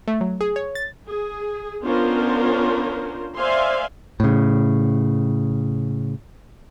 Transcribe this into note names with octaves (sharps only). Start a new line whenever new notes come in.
A3
F#3
G#4
C#5
A6
G#4
B3 C#4 D4 F4 A#4 C5
C5 D5 E5 F5 G#5 C6
A2 C#3